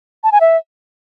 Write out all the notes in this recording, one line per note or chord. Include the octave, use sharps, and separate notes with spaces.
A5
G#5
E5